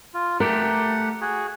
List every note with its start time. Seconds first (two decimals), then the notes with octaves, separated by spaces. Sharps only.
0.14 F4
0.40 A3 G4 A#4 F#5
1.21 F#4 G#4